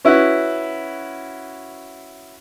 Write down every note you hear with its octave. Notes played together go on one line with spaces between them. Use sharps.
C#4 E4 F#4 B4